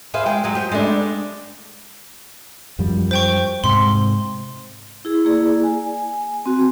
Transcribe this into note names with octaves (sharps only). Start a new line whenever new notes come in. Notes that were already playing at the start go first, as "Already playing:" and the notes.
G#4 B4 C5 E5 F5
G#3 G5
F#3 G#4
G4 C5
G#3 A3 B3 D4
F#2 F3 G3
C5 G5 C#6
G#2 C3 C6
E4 G#4
A#3 E4 G#4 D5
G#5
C4 F#4